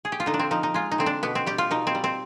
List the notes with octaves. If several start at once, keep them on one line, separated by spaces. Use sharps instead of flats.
G#4
G4
F4
D3 D#4
D4
C4
F3 D#4
D#4
G#3 F4
D#4
D3 C4
D4
B2 B3
C4
G3 G4
F4
B2 D#4
C4
G3
C4